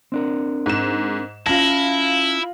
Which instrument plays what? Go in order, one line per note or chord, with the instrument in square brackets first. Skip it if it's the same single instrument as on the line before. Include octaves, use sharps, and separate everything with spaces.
[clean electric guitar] C4 D4 A#4
[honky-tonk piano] G#2 E7
[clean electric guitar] C#4 A5 [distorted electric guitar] E4 [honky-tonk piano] F4 A#6